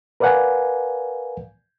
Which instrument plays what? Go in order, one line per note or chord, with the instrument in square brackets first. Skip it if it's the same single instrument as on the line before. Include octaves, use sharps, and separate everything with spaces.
[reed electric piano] A#4 B4 D5 F5 F#5 G#5